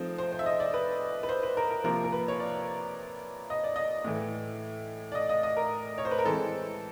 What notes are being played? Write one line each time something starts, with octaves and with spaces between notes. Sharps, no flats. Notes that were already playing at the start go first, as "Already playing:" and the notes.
Already playing: F3 A3 C4 D#4 C5
C5
C5
E5
D#5
D5
B4
B4
C5
B4
A#4
A#4
C3 F3 A#3 A#4
A#4
B4
C#5
D5
D#5
D5
D#5
A2 E3 A3
D5
D#5
D#5
D#5
A#4
C#5
C5
B4
A#4
E3 G#3 C4 A4